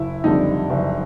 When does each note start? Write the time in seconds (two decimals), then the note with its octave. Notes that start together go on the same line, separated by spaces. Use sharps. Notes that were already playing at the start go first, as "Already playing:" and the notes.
Already playing: F#1 E4
0.24 F2 D3 G3 D#4
0.70 F#1